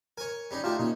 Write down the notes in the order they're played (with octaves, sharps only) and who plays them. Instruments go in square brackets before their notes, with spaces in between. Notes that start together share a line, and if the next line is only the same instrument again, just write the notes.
[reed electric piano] A#4 [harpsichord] C#5 G#5
[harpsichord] G3 C#4 D#4
[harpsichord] A3 D4 D#4 [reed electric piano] F4 G4
[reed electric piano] A#2 D#4 [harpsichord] C#4